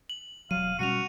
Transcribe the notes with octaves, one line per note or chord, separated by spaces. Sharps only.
F#7
E1 F#3 F5 D#7
B2 G3 C#4 F#4 C#7 D#7 F7